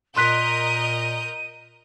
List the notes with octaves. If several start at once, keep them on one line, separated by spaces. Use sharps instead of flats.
A#2 A#4 D#5 C6 F#6 G6 B6 D#7